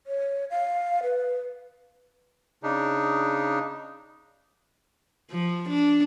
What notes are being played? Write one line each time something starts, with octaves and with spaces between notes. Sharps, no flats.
C#5
F5
B4
C#3 D4 D#4
F3
D4